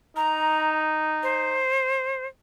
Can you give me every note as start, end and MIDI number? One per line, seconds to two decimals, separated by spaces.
0.16 1.65 63
0.16 0.81 82
1.23 2.26 72